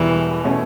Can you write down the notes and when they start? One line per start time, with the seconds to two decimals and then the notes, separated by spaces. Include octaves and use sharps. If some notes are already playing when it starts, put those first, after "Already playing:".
Already playing: E1 E2 B2 E3 G3
0.44 B2 A3 C#4